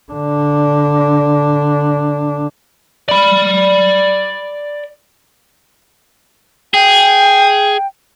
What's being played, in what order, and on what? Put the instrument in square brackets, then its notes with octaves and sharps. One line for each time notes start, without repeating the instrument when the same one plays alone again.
[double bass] D3 D4
[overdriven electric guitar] D5 B5
[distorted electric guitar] G#4 [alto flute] G5